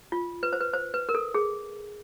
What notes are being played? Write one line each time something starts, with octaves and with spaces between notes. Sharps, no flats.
F4
B4
C5
B4
C5
B4
A#4
A4
G#4